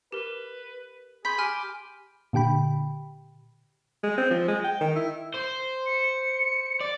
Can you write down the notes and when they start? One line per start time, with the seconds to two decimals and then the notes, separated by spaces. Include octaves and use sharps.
0.12 G4 A#4 B4
1.25 G#4 B5 C6 G6 B6
1.38 G4 G#5 F6
2.33 A#2 D3 G4 G5 B5
4.03 G#3
4.18 C4
4.31 F3
4.48 G#3
4.64 G5
4.81 D#3
4.96 E4
5.34 C5
5.86 C#7
6.81 D5